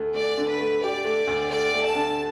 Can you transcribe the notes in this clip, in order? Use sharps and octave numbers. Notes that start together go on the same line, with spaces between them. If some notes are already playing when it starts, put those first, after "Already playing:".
Already playing: D2 A3
A3 D5
D3
B4
A3
G4 D5
A3
D2
A3 D5
A3
A5
D3